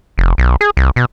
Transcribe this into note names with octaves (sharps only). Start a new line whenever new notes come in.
F1
B1
G#4
C2
B2